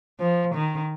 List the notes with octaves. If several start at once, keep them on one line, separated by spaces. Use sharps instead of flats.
F3
D#3